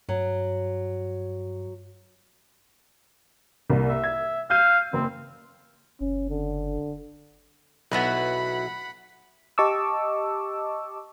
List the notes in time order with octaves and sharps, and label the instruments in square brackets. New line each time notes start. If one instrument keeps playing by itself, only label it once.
[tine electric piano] G2 [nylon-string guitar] F#3
[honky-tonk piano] C2 A#3
[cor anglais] E5
[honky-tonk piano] G#6
[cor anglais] F5 [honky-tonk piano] E6 G6 D#7
[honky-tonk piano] F#1 [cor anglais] C4
[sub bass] F#1 [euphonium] C#4
[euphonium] D3
[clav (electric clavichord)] B1 B3 [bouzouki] E4 F#4 B4 [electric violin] F#5 B5
[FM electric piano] G4 D#5 A5 C#6 D6 E6